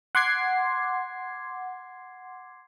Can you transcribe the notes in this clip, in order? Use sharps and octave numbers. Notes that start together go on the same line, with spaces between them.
F#5 C6 D6 G#6 C7